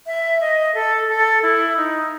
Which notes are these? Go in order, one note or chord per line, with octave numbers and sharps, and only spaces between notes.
E5
D#5
A4
A4
E4
D#4